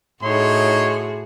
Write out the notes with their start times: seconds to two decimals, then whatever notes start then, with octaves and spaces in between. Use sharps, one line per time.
0.23 A2 D#4 F#4 G#4 C#5 C6